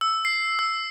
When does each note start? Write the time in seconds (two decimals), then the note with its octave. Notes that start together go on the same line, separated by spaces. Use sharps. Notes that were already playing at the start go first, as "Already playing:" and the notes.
0.01 E6
0.25 C7
0.59 E6